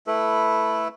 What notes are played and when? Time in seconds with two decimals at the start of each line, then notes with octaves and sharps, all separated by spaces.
0.07 A3 E4 A4 B4